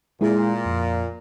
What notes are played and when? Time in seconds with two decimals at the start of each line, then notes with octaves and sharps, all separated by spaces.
0.21 A#2 G#3 E4 G#4
0.65 F2